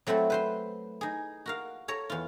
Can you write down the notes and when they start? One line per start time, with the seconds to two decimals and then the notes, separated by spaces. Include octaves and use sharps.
0.07 F#3 A3 C4 E4 A4
0.30 B4 C5 C6
1.01 D#4 G#4
1.46 F#4 A#4 F5
1.88 A4 C#5 A#5
2.10 E2 F4